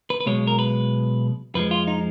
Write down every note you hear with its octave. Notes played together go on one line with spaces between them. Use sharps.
B4
B4
B1 B2 G#3 C#5
A#4
B4
F2 F3 G#3 B4
F4
D#4